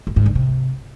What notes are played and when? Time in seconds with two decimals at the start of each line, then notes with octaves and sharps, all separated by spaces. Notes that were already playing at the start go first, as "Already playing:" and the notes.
0.07 F#2
0.16 G#2
0.26 D3
0.35 C3